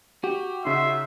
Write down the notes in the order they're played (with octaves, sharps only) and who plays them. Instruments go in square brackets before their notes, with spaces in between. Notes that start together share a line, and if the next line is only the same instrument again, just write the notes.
[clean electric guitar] F#4 [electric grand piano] G4
[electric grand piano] C#3 D#4 [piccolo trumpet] E5 [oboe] C6